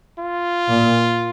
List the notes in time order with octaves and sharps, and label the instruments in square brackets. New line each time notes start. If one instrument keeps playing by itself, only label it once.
[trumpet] F4
[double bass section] A#2